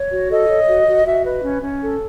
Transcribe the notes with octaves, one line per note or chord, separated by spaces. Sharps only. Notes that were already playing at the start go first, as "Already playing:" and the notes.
Already playing: C#5
F#4
A4 D#5
C#5
F#4
F#4
F#4 E5
B4
C#4
C#4
A4